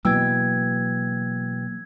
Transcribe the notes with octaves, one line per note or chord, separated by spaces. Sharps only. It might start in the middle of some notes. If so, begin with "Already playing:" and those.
B2 E3 F#3 A#3 B3 G5 E6 G#6